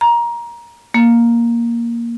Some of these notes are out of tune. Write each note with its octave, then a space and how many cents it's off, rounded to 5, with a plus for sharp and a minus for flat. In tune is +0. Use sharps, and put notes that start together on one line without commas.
A#5 +20
A#3 +5